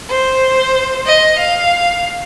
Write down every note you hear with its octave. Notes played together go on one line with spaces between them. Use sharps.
C5
D#5
F5